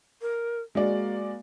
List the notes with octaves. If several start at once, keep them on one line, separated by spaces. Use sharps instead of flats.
A#4
G#3 A#3 F#4 D5